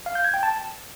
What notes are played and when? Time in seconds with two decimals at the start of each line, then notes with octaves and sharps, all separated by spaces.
0.06 F5
0.15 G6
0.25 G#6
0.34 G5
0.43 A5